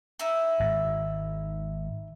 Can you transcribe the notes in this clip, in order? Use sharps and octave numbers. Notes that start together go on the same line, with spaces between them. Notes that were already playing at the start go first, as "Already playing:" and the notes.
D#4 E4 E5
G#1 G#2